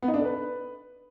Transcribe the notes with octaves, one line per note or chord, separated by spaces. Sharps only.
B3
D#4
D4
A4
B4